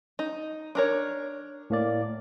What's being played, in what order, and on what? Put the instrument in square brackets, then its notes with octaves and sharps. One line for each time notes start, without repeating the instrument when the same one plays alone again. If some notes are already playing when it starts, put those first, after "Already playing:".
[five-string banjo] D#4
D4 A#4 C#5
[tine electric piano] A2 A#3 D5